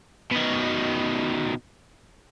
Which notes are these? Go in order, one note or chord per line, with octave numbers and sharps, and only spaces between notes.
B2 D#3